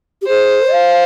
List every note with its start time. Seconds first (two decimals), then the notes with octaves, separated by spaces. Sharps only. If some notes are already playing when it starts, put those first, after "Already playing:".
0.21 G4
0.27 G#4 C5
0.71 F5